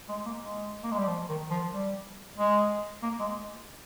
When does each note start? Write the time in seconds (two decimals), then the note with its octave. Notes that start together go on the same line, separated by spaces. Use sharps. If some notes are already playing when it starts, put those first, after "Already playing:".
0.09 G#3
0.26 A#3
0.42 G#3
0.84 A#3
0.91 G#3
0.99 G3
1.07 F3
1.29 D#3
1.50 F3
1.73 G3
2.38 G#3
3.03 A#3
3.19 G#3